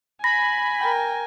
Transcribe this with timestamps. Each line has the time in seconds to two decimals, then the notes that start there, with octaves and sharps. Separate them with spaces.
0.24 G#5 B5 A#6
0.79 A#4 G5